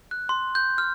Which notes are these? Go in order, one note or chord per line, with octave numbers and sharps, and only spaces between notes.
F#6
C6
G6
F6